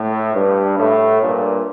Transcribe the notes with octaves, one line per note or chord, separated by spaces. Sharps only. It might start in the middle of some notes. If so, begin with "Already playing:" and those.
Already playing: A2
G2
A2
G2 A#2